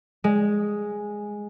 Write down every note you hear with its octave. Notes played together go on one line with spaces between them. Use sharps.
G#3